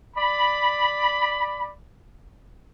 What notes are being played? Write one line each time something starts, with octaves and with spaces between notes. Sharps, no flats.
D5 B5